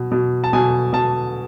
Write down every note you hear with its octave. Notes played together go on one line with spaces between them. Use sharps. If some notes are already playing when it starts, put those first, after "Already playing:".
Already playing: B2
B2
A5
B2 G#5
B2 A5